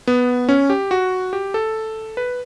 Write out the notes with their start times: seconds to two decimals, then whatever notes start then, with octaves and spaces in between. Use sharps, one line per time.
0.07 B3
0.49 C#4
0.70 G4
0.91 F#4
1.33 G4
1.54 A4
2.17 B4